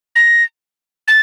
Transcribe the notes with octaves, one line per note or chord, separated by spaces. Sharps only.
A#6
A6